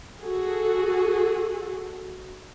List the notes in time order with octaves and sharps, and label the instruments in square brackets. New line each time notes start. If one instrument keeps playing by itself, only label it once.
[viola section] F#4 G#4 A4